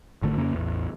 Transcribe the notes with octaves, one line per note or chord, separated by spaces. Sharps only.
G#1 D3 A3
F2 C#3 A#3 C#4
A1 E2